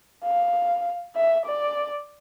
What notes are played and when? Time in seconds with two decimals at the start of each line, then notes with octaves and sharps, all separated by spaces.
0.24 F5
1.16 E5
1.46 D5